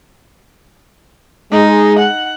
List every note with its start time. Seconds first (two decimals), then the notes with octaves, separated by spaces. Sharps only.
1.52 G#3 D#4
1.99 F#5